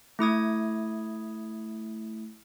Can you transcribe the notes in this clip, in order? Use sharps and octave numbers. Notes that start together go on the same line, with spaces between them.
A3 E4 D#6 G#6